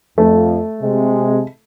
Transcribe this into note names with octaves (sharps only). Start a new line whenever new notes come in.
F2 A3
C3 G#3